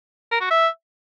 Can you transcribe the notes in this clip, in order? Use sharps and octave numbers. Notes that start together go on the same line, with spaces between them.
A#4
F#4
E5